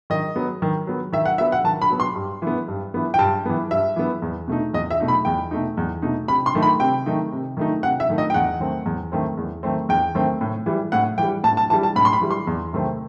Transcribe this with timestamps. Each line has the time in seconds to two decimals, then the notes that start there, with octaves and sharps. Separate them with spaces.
0.10 D#3 D#5
0.36 F#3 B3
0.62 D#3
0.87 F#3 B3
1.13 D#3 E5
1.26 F#5
1.38 F#3 B3 E5
1.52 F#5
1.64 D#3 A5
1.82 B5
1.90 F#3 B3
2.00 C6
2.16 G2
2.42 E3 B3
2.68 G2
2.94 E3 B3
3.14 G5
3.19 G2 A5
3.46 E3 B3
3.71 G2 E5
3.96 E3 B3
4.22 E2
4.48 B2 A3 D#4
4.73 E2 D#5
4.91 E5
5.00 B2 A3 D#4
5.08 B5
5.25 E2 G5
5.51 B2 A3 D#4
5.77 E2
6.02 B2 A3 D#4
6.28 C3 B5
6.46 C6
6.55 D#3 A3 D#4
6.63 B5
6.80 C3 G5
7.06 D#3 A3 D#4
7.32 C3
7.57 D#3 A3 D#4
7.83 C3 F#5
8.00 E5
8.10 D#3 A3 D#4
8.18 D#5
8.30 G5
8.34 E2 F#5
8.60 D#3 A3 C4
8.86 E2
9.12 D#3 A3 C4
9.37 E2
9.63 D#3 A3 C4
9.89 E2 G5
10.15 D#3 A3 C4
10.41 A2
10.66 E3 G3
10.92 A2 F#5
11.18 E3 G3 G5
11.44 A2 A5
11.57 A5
11.70 E3 G3 A5
11.83 A5
11.96 A2 B5
12.05 C6
12.13 B5
12.21 E3 G3
12.31 C6
12.47 E2
12.73 C3 D#3 A3 C4